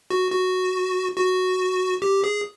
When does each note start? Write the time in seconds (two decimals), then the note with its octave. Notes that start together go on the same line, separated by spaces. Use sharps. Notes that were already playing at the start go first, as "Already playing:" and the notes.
0.10 F#4
0.31 F#4
1.17 F#4
2.02 G4
2.24 G#4